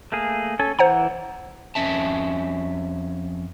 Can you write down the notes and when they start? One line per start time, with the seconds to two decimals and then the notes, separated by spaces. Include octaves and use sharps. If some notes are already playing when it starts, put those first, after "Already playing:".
0.12 A3 A#3 G#4
0.59 C#4 A4 G#5
0.79 E3 C5 F#5 A#5
1.75 F2 C#4 E5 A5